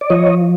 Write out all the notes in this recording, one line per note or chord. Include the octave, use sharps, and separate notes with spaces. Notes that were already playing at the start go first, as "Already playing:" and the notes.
D5
F3 C#5 D#5